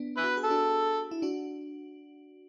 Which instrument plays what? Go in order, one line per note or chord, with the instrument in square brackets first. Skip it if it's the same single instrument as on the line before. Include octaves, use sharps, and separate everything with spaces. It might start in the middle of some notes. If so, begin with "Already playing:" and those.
Already playing: [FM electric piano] B3 D4
[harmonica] E4 B4
[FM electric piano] F#4
G#4
[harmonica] A4
[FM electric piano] D4 F#4
E4
D4 F#4